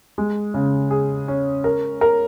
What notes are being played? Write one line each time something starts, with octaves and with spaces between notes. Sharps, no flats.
G#3
C#3
G#4
C#4
A#4
A#4